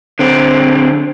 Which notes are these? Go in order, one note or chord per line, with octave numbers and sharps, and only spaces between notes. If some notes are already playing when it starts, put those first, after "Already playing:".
D3 C4